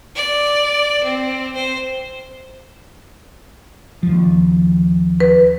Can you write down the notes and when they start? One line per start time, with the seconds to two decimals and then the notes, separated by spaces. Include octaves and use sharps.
0.16 D5
1.04 C4
1.55 C5
4.03 D#2 F3
5.20 B4